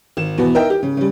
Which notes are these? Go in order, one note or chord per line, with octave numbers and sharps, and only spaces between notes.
G#1 E7
E2 B2 E3 B3
A#4 D#5 E5 G5
G4
C#3
C#3 G3